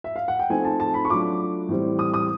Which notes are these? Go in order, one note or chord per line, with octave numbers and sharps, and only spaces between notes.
E5
F5
F#5
G5
F3 A3 C4 D#4 G#5
A5
A5
B5
C#6
F#3 A3 D4 F4 D6
A2 E3 G3 C4
D#6
D#6